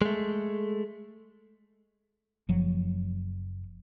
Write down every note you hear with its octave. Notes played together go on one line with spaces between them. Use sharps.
G#3 A3
F#1 F3 F#3